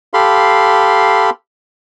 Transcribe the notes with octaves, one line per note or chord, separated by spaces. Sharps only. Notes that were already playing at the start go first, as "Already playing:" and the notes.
G4 A4 F5 B5 C6